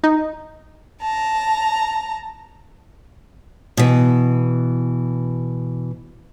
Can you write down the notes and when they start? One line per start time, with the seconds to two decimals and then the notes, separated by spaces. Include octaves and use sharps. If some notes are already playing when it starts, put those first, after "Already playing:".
0.03 D#4
1.01 A5 A#5
3.77 B2 E3